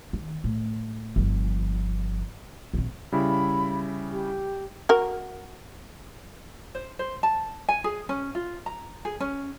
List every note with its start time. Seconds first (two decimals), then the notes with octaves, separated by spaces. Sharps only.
0.13 D#3
0.44 A2
1.16 G1 F3
2.74 A#1 F2
3.12 C#3 G3 E4 B5
4.12 G4
4.89 F#4 A#4
6.75 C5
6.99 C5
7.23 A5
7.69 G#5
7.84 G#4
8.09 C#4
8.35 F4
8.66 A#5
9.05 G#4
9.20 C#4